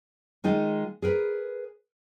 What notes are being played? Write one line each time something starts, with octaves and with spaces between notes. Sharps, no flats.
D#3 G#3 D#4 F4
G#4 A#4 B4